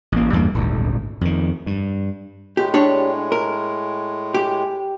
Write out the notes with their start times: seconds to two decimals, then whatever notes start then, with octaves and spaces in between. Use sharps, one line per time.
0.12 A1 A#3
0.33 E2 G2 G#3 A#3
0.54 D#1 G#1 D2
1.21 F2 D#3
1.66 G2
2.57 A2 G#3 G4
2.74 D4 G4 C#5
3.32 A#4
4.34 G4